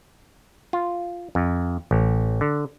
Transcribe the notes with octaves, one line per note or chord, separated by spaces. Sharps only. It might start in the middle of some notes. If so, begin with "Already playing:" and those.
F4
F2
A1
D3